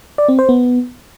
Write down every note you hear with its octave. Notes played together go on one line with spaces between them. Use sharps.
D5
C4
C5
B3